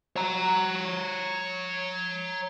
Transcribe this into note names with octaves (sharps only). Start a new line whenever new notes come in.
C#5 A#5